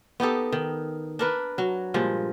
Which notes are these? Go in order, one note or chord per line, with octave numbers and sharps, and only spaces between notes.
B3 D#4 G4 A4
D#3
D4 A#4 B4
F#3
G2 A#2 F3 G#3